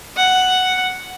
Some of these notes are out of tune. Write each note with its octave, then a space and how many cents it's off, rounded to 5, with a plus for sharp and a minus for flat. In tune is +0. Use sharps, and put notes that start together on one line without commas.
F#5 +0